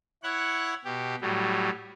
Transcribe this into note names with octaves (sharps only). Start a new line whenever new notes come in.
E4 C#5 F#5 F#6
B2 G4
A2 F#3 G3